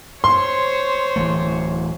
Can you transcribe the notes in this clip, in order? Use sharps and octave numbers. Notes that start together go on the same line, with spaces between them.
C5 C#5 C6
D1 E3 A3